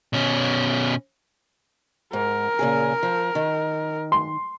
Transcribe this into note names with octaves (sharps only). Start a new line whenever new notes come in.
B2 C#4
G#2 A#4
A#2 C#3 G#4
F3
D#3
C6